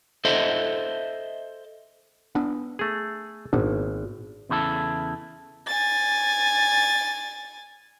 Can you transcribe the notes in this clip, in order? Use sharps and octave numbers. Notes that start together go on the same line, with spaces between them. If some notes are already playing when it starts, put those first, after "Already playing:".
A4 C5 D#5 E5
B3 D4
A3 G#4
G#1 A#2 B3 D4
E2 C#3 E4 F#4 A4
G#5 A6